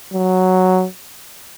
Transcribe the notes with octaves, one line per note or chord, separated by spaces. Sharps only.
F#3